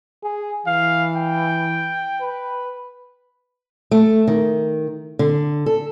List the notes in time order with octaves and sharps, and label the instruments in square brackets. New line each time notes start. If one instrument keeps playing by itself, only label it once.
[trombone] G#4
[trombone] E3 [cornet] F5
[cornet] G5
[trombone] B4
[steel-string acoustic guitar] A3
D#3
D3
A4